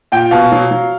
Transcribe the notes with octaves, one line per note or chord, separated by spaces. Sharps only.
A#2 G5
B2 F5
F#3
F#3